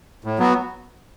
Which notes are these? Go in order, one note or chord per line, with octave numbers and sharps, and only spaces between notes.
A2
F#3 B3 F#4